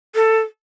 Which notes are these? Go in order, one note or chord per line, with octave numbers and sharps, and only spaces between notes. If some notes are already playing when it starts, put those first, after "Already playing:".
A4